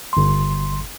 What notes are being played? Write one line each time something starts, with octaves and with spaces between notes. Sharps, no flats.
G1 C6